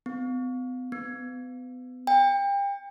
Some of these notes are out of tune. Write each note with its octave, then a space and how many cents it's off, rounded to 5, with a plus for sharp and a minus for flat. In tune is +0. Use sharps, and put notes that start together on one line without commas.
B3 +40
B3 +30
G5 +30